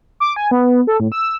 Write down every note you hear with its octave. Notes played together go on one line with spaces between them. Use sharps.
D6
G#5
B3
A4
A2
E6